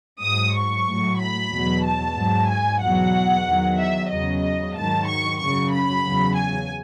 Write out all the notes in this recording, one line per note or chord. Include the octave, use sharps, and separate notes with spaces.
G#2 F#3 D#6
C#6
A2 F#3
B5
E2 B2 F#3
A5
G#2 F#3
G#5
E2 B2 F#3 F#5
E2 D#3 F#3
E5
E2 C#3 F#3 D#5
G#2 D#3 F#3 A5
C#6
F#2 C#3 F#3 C#6
B5
E2 C#3 F#3
G#5